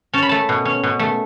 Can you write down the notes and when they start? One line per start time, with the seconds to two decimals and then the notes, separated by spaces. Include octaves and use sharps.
0.13 C#4 A5
0.23 B5
0.29 A3 A5
0.49 B2
0.65 C#4
0.83 B2
0.99 A3